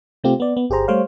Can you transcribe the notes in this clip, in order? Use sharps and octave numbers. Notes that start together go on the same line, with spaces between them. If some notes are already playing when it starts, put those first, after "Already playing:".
C3 A3 C4 F4 G4
B3 D5
B3
G1 G4 G#4 C5 A#5
G3 A3 C5 C#5 F5